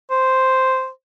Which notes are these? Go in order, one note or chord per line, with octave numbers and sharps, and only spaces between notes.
C5